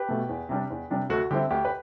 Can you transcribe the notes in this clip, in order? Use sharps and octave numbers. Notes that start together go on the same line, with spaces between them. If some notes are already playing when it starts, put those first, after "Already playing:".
Already playing: G4 B4
B2 A3
E2
C3 G3 D4
E2
C3 G3 D4
D2 F#4 A4
D3 G3 C4 E4 G4
D2 G4
B4